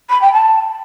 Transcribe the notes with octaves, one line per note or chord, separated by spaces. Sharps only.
B5
G5
A5